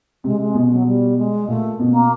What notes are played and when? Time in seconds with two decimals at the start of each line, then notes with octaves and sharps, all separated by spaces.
0.24 C3 G#3
0.40 G#3
0.55 B2
0.71 F#3
0.86 G3
1.17 G#3
1.48 A#2 A3
1.80 B2
1.89 A#3